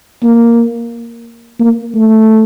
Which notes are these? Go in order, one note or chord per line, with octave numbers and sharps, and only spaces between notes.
A#3
A#3
A3